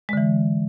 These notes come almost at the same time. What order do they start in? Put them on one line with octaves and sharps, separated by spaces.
G#3 D3 E3